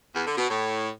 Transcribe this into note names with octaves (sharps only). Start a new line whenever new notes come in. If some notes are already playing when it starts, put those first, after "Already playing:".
E2
D3
B2
A2